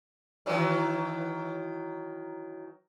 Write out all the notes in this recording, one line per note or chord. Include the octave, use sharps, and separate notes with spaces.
D#3 E3 F#3